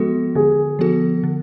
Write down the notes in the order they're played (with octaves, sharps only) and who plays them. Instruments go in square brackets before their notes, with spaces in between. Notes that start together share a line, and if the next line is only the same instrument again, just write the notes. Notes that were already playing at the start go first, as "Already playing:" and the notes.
Already playing: [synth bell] F3 G#3 B3 F#4 A4
[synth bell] D3 [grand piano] G#4
[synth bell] F3 B3 F#4 A4
D3